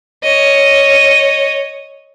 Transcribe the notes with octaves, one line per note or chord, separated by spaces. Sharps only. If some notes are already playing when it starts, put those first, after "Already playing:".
C#5 D#5